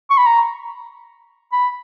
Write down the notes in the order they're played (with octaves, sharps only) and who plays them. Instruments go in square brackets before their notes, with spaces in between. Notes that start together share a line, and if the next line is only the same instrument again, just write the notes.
[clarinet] C#6
B5
A#5
B5